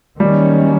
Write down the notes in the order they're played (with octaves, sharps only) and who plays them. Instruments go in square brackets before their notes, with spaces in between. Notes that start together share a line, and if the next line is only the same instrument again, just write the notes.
[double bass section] D#3 F#3 A#3 C#4 [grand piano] G3